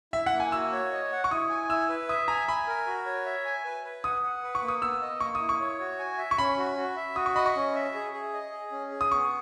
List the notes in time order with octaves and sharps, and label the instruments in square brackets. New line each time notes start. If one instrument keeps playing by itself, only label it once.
[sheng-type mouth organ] E4 [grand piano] E5
[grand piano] F#5
[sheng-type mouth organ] A#3
[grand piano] G#5
[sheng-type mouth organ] F#4 [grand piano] E6
[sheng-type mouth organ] C#5
D#5
F#5
[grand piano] C#6
[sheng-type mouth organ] E4 [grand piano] D#6
[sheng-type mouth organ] G#5
[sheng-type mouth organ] E4 [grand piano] E6
[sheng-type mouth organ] B4
[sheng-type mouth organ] E5 [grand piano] D#6
[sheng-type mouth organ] G#5 [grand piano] A#5
[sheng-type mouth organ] G#5 [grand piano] B5
[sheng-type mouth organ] A#4
F#4
C#5
E5
G#5
B4
B4
[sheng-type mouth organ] F#5 [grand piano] D#6
[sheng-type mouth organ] F#5
B4
[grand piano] C#6
[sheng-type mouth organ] A#3
[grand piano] D#6
[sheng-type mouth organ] B3 [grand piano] E6
[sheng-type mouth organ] D#5
[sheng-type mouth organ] A#3 [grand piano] C#6
[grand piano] D#6
[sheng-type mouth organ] E4
[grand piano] C#6
[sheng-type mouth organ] C#5
F#4
G#5
E5
[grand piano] C#6
[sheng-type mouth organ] C#4 [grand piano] B5
[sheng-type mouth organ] F#4
F#4
E5
[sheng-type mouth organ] F#4 [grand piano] D#6
[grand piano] C#6
[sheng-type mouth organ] D#5 [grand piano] B5
[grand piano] C#6
[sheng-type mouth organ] C#4
E5
G#4
G#4
D#5
G#4
C#4
G#4
[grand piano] D#6
[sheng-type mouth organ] B3 [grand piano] C#6